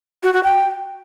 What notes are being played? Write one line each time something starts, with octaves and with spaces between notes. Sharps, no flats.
F#4
F#4
G5